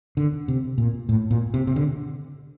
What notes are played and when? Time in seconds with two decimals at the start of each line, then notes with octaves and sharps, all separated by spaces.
0.17 D3
0.48 C3
0.78 A#2
1.09 A2
1.31 A#2
1.54 C3
1.67 C3
1.76 D3